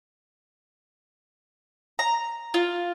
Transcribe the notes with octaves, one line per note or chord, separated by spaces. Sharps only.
A#5
F4